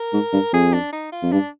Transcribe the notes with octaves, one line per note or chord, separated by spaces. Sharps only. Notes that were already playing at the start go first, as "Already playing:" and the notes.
Already playing: A#4
G#2
G2
F2 G#4
D4
D#4
F4
F2
G2 D4